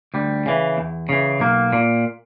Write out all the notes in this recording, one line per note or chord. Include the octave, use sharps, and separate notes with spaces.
D2 G3
C#3 E3
E2
C#3 E3
B1 A#3
A#2